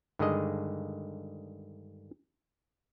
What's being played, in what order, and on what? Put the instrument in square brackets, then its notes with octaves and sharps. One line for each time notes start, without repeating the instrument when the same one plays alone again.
[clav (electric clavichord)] G2 D3 D#3 G#3 G#4 D#5